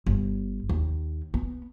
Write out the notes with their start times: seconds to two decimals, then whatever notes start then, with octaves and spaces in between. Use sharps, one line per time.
0.06 G1
0.69 D#2
1.34 B3